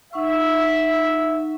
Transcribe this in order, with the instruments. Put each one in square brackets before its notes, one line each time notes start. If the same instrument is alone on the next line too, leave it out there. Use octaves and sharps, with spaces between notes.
[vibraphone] D#4 F#5 C#6 [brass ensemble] E5